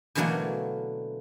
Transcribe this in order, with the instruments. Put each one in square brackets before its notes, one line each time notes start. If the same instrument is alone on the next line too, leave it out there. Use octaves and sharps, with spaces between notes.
[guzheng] B2 D3 E3 F#3 A3 A#3